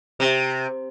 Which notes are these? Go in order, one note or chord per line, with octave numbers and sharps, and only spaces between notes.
C3